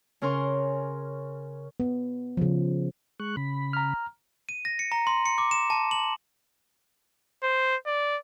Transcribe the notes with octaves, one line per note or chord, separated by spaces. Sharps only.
C#3 C#4 A#4 C6 C#6
B3
C#3 F3
G#3 C#6 F#6
C#3 B5
A#5 F6
D#7
A#6
C#7
A#5
C6
C#7
D6
E7
A5
F#7
C5
D5